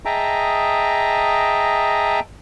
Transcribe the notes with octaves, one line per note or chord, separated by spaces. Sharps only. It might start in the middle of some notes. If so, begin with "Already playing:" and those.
G#4 D#5 E5 G5 A5 A#5